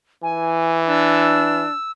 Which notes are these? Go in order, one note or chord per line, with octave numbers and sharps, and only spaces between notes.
E3 G#5
D4 E6